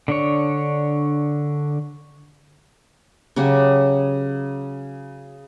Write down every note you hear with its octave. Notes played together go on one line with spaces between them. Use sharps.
D3 D4 C#5
C#3 F#3 F#4 G4